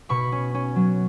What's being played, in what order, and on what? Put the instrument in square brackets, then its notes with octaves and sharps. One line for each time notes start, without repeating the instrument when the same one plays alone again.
[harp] B2 B5 C#6
C#4
C#4
F#3